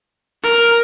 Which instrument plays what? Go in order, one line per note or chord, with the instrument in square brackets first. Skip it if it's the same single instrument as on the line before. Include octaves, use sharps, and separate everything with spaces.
[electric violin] A#4